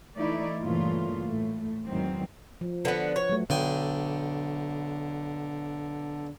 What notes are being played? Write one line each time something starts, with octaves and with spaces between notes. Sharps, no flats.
E3 A3 D#4 E4 D5
G2 A#2 C#3 E3 A3 F4
A2 A3
E2 G#2 D#3 E3 F#3 C4
F3
D3 B3 B4 F#5
C#5
F#3 A3
B1 D3 G5 G#5